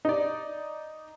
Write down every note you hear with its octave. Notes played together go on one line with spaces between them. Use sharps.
D#4 D5